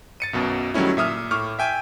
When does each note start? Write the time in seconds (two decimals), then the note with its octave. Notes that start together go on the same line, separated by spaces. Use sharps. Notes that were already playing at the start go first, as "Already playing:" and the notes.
0.20 A6 C#7 D#7
0.33 B1 F#2 B2
0.74 D#3 F#3 G3 A3 C#4 E4
0.97 A#2 E5 D#6 F6
1.31 A2 C#6 D6 F6
1.59 E5 G5 G#5